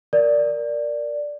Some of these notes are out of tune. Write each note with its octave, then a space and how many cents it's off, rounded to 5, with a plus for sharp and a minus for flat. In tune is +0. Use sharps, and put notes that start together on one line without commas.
A#4 +0 D5 +0